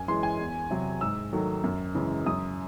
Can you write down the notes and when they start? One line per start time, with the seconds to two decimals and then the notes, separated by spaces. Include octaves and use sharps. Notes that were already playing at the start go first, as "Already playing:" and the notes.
Already playing: F#2 G#5
0.08 E3 G#3 C6
0.23 G#5
0.39 E2
0.70 C3 F#3
1.01 G#2 E6
1.33 D#3 F#3 A3
1.64 F#2
1.95 C#3 E3 G#3
2.26 F#2 D#6